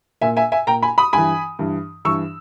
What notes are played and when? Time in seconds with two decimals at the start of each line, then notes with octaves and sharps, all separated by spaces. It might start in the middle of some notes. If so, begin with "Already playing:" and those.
0.22 A#2 E5 G#5
0.37 E5 G#5
0.52 E5 G#5
0.67 A#2 G5 A#5
0.83 G#5 B5
0.98 B5 D#6
1.13 G2 E3 G#5 B5
1.59 G2 E3
2.05 G2 E3 C#6 E6